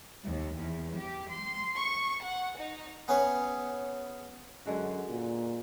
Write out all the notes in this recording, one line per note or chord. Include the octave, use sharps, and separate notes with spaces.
D#2
E2
G4
C6
C#6
F#5
D#4
B3 C#4 G#4 B4 C#5
F#2 D3 G#3 F#4
A#2